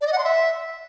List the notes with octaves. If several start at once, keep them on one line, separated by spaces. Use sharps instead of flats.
D5
D#5
F#5
C6
E5